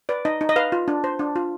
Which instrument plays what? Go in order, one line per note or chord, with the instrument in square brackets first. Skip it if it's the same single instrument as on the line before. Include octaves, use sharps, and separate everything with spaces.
[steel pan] B4 D5
D#4 D#5
D#4
D#5
B4 F5
F4
D4
C5
D4
F4